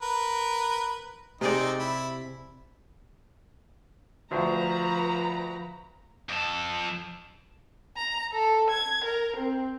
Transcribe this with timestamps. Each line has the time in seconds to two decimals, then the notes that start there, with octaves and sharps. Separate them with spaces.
0.02 A#4 B4
1.41 C3 C4 D#4 G#4 D5
1.79 E4
4.31 D2 F3 B4 A#5
6.29 F2 A4
7.97 A#5
8.32 A4
8.70 G#6
9.04 A#4
9.37 C4